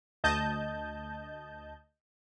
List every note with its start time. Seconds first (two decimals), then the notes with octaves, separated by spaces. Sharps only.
0.24 D2 D#5 A5 G6